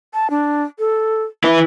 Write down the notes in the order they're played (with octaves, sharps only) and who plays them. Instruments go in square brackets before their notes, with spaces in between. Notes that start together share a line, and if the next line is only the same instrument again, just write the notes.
[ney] A5
D4
A4
[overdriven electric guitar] E4 B4 [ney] E5